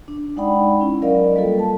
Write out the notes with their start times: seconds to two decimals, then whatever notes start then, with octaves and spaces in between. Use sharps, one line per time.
0.08 D4
0.36 G#3 D#4 D5 F#5 G5 B5
0.81 C#4 E4
1.02 F#3 A#4 D5 D#5 F5
1.36 G3 A#3 F4 A4
1.59 A5